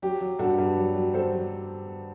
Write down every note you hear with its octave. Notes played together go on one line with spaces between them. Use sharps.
F#3 G4
F#3
G2 F#4 A4
G2
F#3
F#3
F#3 A4 C5
F#3